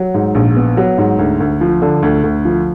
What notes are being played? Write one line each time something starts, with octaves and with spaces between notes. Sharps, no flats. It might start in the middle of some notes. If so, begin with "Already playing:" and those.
Already playing: F#3
G#2
A#1
B3
F#3
G#2
D2
D2
F3
D3
D2
D2
F3